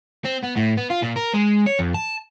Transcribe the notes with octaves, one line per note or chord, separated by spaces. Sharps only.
C4
B3
A2
B3
F4
A#2
A#4
G#3
C#5
F2
A5